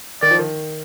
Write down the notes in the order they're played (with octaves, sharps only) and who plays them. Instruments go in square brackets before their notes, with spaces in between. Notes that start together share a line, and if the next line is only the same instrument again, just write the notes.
[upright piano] D#3 [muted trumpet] D5
[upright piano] F3
D#3